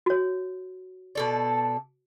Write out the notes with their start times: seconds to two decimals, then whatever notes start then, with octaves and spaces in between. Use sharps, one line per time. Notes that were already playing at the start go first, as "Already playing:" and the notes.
0.06 F#4 C#5
1.15 B2 A4 D5